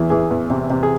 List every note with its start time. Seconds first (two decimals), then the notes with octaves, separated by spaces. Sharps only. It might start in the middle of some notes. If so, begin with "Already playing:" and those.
Already playing: E2 E3 G#4
0.10 E3 G#4
0.31 E2
0.50 C3
0.70 C3
0.83 G#4